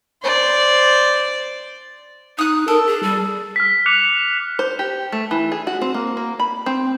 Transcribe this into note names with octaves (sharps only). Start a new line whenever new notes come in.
C5 D5
D#4 D#6 F#6
A4 A#4
G#4
G3
F6 B6
D6 F#6 C#7 F7
C5
G4
A3
E3
G#4
F#4
C4
A#3
A#3
B5
C4